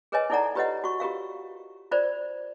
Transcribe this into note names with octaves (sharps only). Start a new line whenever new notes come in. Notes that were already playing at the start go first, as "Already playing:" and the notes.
G#4 A#4 B4 C#5 D#5 G#5
D#4 E4 A4 D5 F#5 A#5
F4 G4 B4 C#5 D#5 F#5
F#4 C#6
F4 G4 A#4 F5
F4 A#4 C5 D5